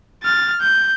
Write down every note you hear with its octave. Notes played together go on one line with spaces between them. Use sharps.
F6 A6
G6